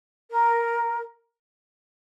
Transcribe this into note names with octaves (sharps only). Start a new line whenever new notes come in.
A#4